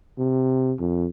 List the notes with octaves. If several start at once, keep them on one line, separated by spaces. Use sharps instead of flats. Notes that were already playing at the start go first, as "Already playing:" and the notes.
C3
F2